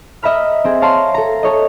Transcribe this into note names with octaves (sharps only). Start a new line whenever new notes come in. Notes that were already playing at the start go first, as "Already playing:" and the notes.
D#5 E5 A#5 B5 F6
C4 G#4
C#5 F5 A5 A#5 C6
A4 A#5
A4 C#5 D#5